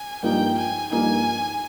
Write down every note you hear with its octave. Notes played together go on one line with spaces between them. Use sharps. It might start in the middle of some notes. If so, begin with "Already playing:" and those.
Already playing: G#5
G2 F3 A#3 D#4 G5
G#5
G2 F3 A#3 D#4 G#5